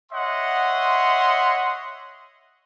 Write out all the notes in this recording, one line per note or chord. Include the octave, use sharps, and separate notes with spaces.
C#5 D#5 E5 F#5 C6